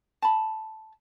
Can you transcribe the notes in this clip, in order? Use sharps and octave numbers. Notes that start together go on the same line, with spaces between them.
A5 B5